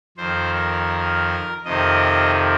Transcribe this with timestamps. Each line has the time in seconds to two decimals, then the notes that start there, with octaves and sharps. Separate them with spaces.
0.17 F2 D#3 C5
0.54 A#4
1.65 F2 C3 D#3 D#5